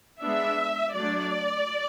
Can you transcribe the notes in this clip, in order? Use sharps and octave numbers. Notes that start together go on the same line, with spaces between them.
G#3 B3 D4 E5
F#3 A3 D4 D5